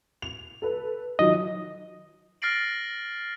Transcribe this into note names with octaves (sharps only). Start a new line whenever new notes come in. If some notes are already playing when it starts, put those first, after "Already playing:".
F7
A4 B4
D#3 F3 F#3 D#5
F6 A6 A#6 C7 D7 F#7